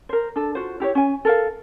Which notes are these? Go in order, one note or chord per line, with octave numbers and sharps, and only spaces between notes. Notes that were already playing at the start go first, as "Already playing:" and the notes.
A#4 C5
D4 A4
F4 F#4 C5
E4 G4 B4 C#5
C#4 G#5
A4 A#4 F5